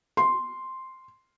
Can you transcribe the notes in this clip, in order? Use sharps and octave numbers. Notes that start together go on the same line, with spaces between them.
C6